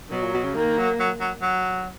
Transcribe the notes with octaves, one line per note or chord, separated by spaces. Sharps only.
B2 F#3
A#2
B2
C#3
D#3 A#3
F#3
F#3
F#3
F#3